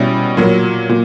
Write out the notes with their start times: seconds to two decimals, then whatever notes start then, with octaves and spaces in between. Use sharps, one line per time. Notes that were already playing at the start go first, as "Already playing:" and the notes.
Already playing: B2 G3 C#4 E4
0.37 A#2 F#3 A#3
0.89 A#2